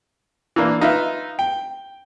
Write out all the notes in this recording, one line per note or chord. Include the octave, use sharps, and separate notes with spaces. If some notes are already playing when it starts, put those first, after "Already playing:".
E3 A#3 D4
D#4 F4 B4 E5
G5